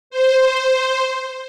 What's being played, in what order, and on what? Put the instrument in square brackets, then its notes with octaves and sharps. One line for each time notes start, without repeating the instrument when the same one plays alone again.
[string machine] C5